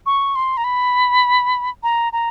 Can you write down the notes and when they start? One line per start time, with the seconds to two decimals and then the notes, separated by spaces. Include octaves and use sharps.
0.06 C#6
0.36 C6
0.57 A#5
0.64 B5
1.83 A#5
2.13 A#5